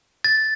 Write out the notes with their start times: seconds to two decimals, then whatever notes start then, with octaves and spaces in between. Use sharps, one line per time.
0.24 A6